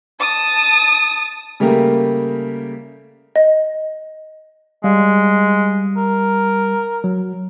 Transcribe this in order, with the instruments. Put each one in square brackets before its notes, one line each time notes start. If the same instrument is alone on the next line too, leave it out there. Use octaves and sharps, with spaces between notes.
[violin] A5 D#6
[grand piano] C#3 G3 A3 A#3 G4 A#4
[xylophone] D#5
[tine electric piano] G3 F5 [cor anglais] G#3
[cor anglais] A#4
[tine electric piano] F#3